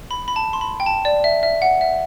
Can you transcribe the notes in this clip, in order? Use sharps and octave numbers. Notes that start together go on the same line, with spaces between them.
B5
B5
A5
C6
B5
G5
A5
D5
E5
E5
F#5
E5